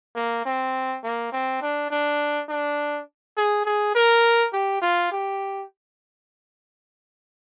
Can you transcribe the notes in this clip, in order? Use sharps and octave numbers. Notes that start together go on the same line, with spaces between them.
A#3
C4
A#3
C4
D4
D4
D4
G#4
G#4
A#4
G4
F4
G4